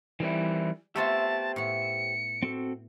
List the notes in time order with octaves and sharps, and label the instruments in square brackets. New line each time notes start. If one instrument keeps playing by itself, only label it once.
[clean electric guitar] D#3 C4 E4 [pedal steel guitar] E3 G3
[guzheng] A3 B3 F4 [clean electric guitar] G4 C5 [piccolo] A5 [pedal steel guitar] E6
[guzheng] A2 B3 [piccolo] C#7
[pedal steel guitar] C4 F#4 A4